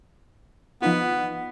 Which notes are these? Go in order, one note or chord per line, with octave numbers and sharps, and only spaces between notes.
F3 B3 D#4 F4